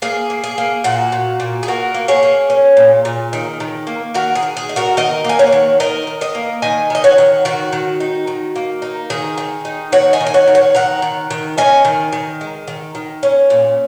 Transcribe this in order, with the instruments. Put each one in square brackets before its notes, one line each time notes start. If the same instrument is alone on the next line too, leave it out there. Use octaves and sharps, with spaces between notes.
[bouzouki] A#3 G#4
A#3
G#4
A#3
A#2 F#4
A#2
A#2
G#4
A#3 F#4 A#4
A#3
G#4 C#5
A#3
C#4
A#2
A#2
D#3
D#3
A#3
D#3 F#4 A#4
G#4
D#3
G#4
D#4
F#4 A#4
D#3 A#4 D#5
A#3 G#5
C#5 F#5
D#3
D#3 A#4 D#5
D#3
A#4 D#5
A#3
D#3 D#5 G#5
D#3 D#5
C#5 F#5
D#3
D#3 F#4
D#3
D#4
D#3
A#3
D#4
D#3 G#4
D#3
D#4
D#3 C#5 F#5
D#5 G#5
D#3
G#5
C#5 F#5
D#3
C#5 F#5
D#3 F#5 A#5
D#3
D#3
C#4 D#5 G#5
D#3
D#3
G#3
D#3
D#3
C#4
A#2